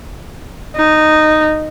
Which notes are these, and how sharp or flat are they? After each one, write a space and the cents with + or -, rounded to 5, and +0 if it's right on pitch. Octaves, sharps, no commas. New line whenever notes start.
D#4 -10